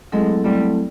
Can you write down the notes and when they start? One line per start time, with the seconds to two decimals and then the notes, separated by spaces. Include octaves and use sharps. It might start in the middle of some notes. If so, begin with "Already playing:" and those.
0.12 F#3 G#3 A3 C4 E4 A4
0.44 F#3 G3 A3 C4 E4 A4